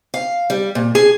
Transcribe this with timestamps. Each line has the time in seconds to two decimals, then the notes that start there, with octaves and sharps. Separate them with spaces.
0.14 F5
0.50 G3
0.75 A#2
0.95 G#4